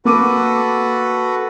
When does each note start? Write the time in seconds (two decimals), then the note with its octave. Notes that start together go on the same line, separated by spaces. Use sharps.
0.05 A#3 F#4 A4 B4 D6 D#7